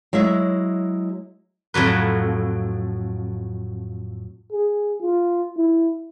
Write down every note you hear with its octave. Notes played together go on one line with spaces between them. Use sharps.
F#3 G#3 E4 E5
F2 A2 F#3 B4
G#4
F4
E4